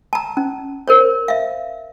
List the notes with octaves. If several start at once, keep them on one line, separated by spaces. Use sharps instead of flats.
A5 A#5
C#4
A#4 C5 C#5
E5 F5